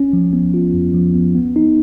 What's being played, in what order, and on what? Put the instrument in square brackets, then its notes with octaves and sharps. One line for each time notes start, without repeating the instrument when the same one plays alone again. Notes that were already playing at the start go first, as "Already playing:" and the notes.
Already playing: [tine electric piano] C#4
F3
B3
F4
F2
F3
B3
B3
D#4